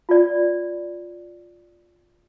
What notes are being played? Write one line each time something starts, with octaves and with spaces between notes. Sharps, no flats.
F4 D5